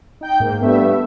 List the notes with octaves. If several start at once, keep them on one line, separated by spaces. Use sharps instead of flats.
D#4 G5 G6
G#2 A#3
G2 A3 B3 E5